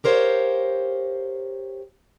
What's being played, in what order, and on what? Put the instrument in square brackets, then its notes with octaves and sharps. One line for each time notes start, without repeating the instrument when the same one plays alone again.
[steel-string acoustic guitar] G4 A#4 C5 C#5 F5